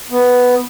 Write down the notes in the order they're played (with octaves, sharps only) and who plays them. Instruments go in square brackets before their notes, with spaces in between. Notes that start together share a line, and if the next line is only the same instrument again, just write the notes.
[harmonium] B3